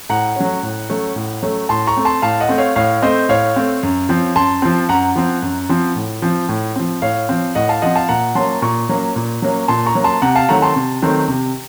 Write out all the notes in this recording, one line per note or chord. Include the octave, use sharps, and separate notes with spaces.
A2 F#5 A#5
F#3 A3 C#4
A2
F#3 A3 C#4
A2
F#3 A3 C#4
A2 A5 C6
A#5 C#6
A3 C4
A5 C6
A2 F5 A5
D#5 F#5
A3 C4
C#5 F5
A2 C#5 F5
A3 C4 C5 D#5
A2 C#5 F5
A3 C4
F#2
F3 C4
F#2 A5 C6
F3 C4
F#2 F#5 A#5
F3 C4
F#2
F3 C4
A2
F3 C4
A2
F3 C4
A2 C#5 F5
F3 C4
A2 D#5 F#5
F5 A5
F3 C4 D#5 F#5
F5 A5
A#2 F#5 A#5
F#3 A#3 C#4 A5 C6
A#2 A#5 C#6
F#3 A#3 C#4
A#2
F#3 A#3 C#4
A#2 A5 C6
A#5 C#6
F#3 A#3 C#4
A5 C6
C3 F#5 A#5
F5 A5
D#3 F#3 A3 C4 F#5 A#5
A5 C6
C3
D#3 F#3 A3 C4
C3